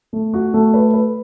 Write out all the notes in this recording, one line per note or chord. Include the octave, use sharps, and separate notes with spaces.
A3
F#4
A3
B4
B4